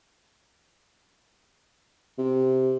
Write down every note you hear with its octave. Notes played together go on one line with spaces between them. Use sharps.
C3